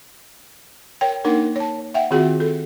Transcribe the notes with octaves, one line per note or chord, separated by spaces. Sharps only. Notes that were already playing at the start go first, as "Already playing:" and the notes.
A#4 C#5 G5
A#3 D4 D#4 A#4 F#5
C#5 A5
E5 F#5 G5
D#3 C4 F4 F#4 G#4 F#5
A4